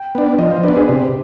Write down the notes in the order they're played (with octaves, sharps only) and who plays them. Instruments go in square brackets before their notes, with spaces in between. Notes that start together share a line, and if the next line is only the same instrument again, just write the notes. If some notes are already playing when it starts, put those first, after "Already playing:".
Already playing: [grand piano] G5
[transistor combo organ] B3 D4
[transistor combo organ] F3 [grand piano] D#5
[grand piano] C5
[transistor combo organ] B3 D4 [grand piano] B4
[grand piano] G#4
[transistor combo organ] C3 [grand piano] G4